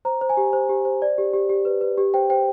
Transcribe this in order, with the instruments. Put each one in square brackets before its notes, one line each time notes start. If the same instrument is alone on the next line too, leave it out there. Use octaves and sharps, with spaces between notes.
[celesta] C5 A#5
C5
G#5
G4
C5
G4
C5
D5
G4
G4
G4
B4
B4
G4
C5 G5
C5 G5